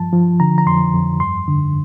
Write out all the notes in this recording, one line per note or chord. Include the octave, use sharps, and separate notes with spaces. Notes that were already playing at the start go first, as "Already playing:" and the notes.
Already playing: G2 F3 A5
F3
D3 A#5
A#5
F2 C6
F2
G2 C6
D3